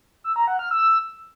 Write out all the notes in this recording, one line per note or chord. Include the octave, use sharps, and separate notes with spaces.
E6
A#5
F#5
F6
E6